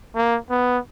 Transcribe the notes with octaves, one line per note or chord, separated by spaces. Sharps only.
A#3
B3